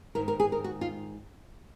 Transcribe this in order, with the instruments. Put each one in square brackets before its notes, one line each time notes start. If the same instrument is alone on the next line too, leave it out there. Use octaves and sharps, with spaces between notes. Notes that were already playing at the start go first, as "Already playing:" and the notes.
[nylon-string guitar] G#2 D#3 A#4
A#4
G#4
A#4
F#4
F4